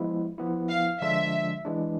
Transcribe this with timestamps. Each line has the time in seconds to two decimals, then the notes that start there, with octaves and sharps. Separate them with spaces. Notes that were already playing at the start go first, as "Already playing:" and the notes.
Already playing: F3 G#3 B3 E4
0.38 F3 B3 E4
0.69 F5
1.01 D3 F3 G#3 D4 F4 E5
1.65 E3 G#3 D4